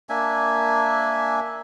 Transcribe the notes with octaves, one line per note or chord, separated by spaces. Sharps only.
A#3 D4 E5 G#5